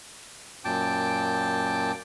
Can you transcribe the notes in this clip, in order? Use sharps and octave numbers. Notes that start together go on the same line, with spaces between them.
F#2 A#2 G5 A5 D6